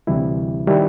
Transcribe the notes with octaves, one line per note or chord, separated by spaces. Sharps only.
D2 C3 E3 G3 E4
D#3 G3 E4